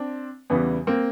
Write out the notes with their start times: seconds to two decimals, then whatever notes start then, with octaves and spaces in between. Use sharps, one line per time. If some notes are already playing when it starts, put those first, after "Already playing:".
Already playing: C4 D4
0.50 E2 C#3 E3 G3 B3
0.87 A#3 C4